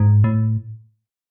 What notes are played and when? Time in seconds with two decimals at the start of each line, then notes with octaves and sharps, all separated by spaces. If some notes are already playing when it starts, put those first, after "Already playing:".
Already playing: G#2
0.24 A2